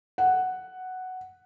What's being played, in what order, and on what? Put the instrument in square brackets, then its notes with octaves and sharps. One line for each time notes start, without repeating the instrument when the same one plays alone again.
[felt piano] F#5